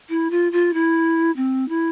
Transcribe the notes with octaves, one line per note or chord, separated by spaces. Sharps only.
E4
F4
F4
E4
C4
E4